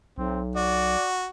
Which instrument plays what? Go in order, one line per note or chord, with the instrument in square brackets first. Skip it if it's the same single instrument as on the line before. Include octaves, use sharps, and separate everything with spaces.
[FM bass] B1 [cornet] C4
[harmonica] F#4 [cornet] D5